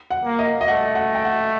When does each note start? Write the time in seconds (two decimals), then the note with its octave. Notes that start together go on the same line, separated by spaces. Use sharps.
0.10 F#5
0.25 A#3
0.39 D#5
0.61 D#5
0.68 A3 F#5
0.95 F#5
1.15 G5
1.25 F#5